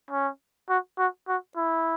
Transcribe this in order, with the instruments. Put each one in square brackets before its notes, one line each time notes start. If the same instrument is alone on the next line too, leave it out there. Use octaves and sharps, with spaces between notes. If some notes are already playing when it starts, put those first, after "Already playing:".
[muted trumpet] C#4
F#4
F#4
F#4
E4